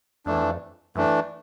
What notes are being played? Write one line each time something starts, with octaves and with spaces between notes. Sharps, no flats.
F2 E3 A3 D4
E2
F2
F#2 E3 A3 D4